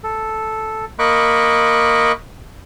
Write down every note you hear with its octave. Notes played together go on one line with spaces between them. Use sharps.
A4
A#3 D#5 B5 C#6 D6 F#6